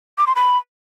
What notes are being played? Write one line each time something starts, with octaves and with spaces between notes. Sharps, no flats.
D6
C6
B5